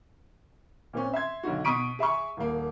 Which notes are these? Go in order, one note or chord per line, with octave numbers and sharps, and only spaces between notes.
A#2 C4 C#4
E5 C6 G#6
B1 D3 D#4 F#4
B2 C#6 D#6 B6 D7 D#7
G#4 E5 B5 C#6
D#1 A#3